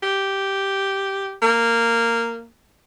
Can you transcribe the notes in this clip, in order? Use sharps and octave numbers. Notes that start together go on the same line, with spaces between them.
G4
A#3